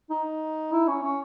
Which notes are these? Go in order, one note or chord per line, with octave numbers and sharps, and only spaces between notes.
D#4
E4
C#4
C#4